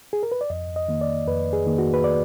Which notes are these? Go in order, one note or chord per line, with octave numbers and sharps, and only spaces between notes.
G#4
A#4
B4
D5
F2 D#5
D#5
D#3 A#3
D5
F2 B4
G#4
D#3 A#3
F#4
B4
D5